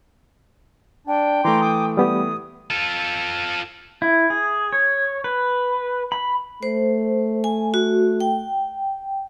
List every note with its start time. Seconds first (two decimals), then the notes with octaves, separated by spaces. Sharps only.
1.07 D4 G5
1.45 E3 A3 A#5 C6 D6
1.61 D6 D#6
1.97 G3 B3 G4 D#6
2.70 F4 A4
4.02 E4
4.30 G#4
4.73 C#5
5.24 B4
6.12 B5
6.63 A3 C5
7.44 G#5
7.74 F#4
8.20 G5